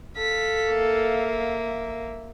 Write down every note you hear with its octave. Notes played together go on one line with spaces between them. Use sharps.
A4 F5 B6
A#3 E5